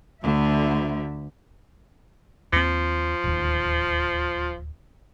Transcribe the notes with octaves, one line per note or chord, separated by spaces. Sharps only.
D2 D3 E5
D#2 F3 C4
D1 D#2